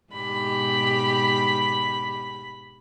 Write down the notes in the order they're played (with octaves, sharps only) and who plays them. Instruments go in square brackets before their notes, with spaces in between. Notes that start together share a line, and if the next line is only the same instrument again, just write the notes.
[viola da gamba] G#2 B2 G4 [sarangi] B5